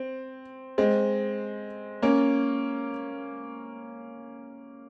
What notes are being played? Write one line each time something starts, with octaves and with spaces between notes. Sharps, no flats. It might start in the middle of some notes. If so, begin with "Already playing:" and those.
Already playing: C4
G#3 C4
A#3 C#4